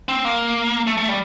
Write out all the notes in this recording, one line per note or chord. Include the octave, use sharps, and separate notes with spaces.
C4
A#3
A3
A3
G3